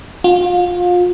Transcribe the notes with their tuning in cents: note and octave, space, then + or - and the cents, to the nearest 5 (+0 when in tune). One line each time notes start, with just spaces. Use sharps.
F4 +30